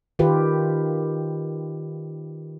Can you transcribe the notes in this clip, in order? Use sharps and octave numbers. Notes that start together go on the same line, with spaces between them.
D#3 F4 G4 B4